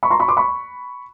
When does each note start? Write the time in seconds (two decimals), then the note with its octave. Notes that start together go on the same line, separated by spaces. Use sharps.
0.03 B5 C#6
0.11 A#5 C6
0.20 B5 C#6
0.28 C6 D6
0.37 B5 C#6